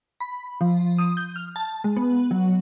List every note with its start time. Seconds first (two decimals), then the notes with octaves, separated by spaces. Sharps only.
0.20 B5
0.61 F3
0.98 D#6
1.17 G6
1.36 F6
1.56 A5
1.84 G#3
1.97 B3
2.31 F#3